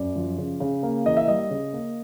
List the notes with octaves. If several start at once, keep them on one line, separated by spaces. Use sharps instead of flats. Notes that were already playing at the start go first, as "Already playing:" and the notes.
Already playing: F#2 D5
F3
C#3
C#3
A#3
E3 D#5
E5
G3 D#5
C#3
A#3